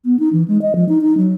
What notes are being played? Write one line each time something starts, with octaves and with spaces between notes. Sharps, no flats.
B3
D#4
E3
G#3
D#5
F3
D#4
D#4
F#3